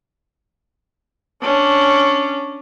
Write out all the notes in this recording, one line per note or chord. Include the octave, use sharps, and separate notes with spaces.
C#4 D4